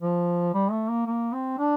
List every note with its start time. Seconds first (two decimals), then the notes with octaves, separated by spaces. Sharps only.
0.02 F3
0.54 G3
0.71 A3
0.89 A#3
1.07 A#3
1.33 C4
1.59 D4